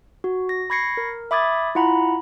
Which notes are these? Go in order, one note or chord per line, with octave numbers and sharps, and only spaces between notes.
F#4
A#6
B5 C#6 G#6 A#6 C7 C#7
A#4
E5 B5 D6 D#6 G#6 A6
E4 F4 F#5 A#5 B5